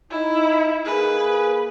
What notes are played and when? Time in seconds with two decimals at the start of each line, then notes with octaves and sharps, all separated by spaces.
0.11 D#4 E4
0.85 A#3 G#4 B4